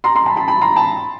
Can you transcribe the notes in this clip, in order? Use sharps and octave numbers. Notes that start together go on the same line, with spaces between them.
A#5 C6
A#5 C6
A5 B5
A5 B5
A5 B5
A#5 C6
A5 B5